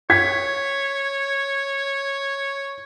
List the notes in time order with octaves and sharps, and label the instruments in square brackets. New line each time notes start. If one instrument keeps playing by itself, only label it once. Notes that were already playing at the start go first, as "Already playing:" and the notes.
[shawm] C#5 [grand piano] G#6 B6